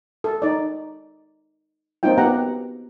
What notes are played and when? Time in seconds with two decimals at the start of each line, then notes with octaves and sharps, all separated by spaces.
0.24 A4
0.42 D#4 D5
2.03 A#3 C4 C#4 D#4 F4 G5
2.18 B3 G4 F#5 A#5